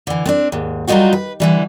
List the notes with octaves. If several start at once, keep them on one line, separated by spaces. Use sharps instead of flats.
D3 E3
B3 C4 D4
D#2 G#2
F#3 G3 B3 D#4 F4 F#4
B4
D3 E3 G3